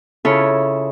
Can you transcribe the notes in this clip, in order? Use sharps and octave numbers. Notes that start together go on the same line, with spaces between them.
C#3 E4 F4 A4 C#5